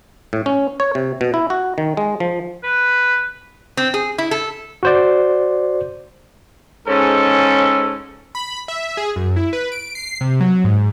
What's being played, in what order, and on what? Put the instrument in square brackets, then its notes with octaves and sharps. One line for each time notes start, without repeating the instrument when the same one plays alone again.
[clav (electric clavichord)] A2
C#4
C#5
C3
B2
E4
F#4
D#3
G#3
F3
[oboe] B4
[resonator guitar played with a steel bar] C4
G#4
E4
A4
[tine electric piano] F#4 C5 D5
[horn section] G#2 C#4 A4
[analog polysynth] B5
E5
G#4
F#2
E4
B4
D7
C7
C3
F#3
G#2